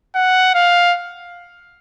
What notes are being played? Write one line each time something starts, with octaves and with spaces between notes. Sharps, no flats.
F#5
F5